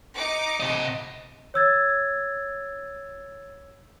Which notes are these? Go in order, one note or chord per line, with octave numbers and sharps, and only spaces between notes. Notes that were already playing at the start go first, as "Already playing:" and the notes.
D#4 D6 C#7
C3 D#5
C#5 E6 G#6 A6